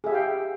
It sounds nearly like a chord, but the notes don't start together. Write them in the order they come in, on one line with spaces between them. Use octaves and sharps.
G#4 E5 G4 F5 G5